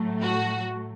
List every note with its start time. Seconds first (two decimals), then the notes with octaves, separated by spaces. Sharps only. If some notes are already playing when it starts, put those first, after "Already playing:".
Already playing: A2 F#3 A3
0.21 F#4